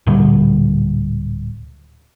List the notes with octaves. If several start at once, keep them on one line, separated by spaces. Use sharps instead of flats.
D1 A#2 D3 G3